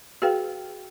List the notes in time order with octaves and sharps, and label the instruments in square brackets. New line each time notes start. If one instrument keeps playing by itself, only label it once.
[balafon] F#4 G#4 B4 F5 G5